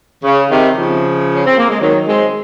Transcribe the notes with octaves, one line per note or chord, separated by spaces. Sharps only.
C#3
C3 D#3
C#3 F3
C#4
C4
A#3
G#3
D#3 F#3
G#3 C4